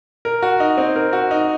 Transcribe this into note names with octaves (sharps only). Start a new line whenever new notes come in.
A#4
F#4
D#4
C4
A#4
F#4
D#4